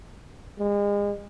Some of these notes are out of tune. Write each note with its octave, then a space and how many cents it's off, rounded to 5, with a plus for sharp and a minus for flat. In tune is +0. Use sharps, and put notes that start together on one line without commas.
G#3 -35